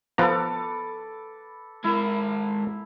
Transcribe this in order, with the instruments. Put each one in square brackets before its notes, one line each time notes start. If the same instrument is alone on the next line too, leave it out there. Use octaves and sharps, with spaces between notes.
[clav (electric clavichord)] F3 B3 A#5 [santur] A4 B4 D6
[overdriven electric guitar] G#3 A#4 [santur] E4